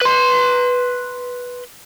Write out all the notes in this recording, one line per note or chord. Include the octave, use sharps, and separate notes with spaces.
B4 C6